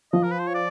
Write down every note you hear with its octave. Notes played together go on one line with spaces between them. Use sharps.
F3 D#5
A#4
B4
C5
C#5
D5